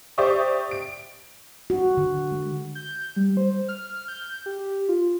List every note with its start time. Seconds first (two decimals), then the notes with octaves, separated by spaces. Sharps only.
0.18 G4 C5 D5 E5 C#6 D#6
0.71 D7
1.70 F#4
1.97 D3
2.32 G#3
2.75 G6
3.16 G3
3.37 C5
3.69 F6
4.08 G6
4.46 G4
4.89 F4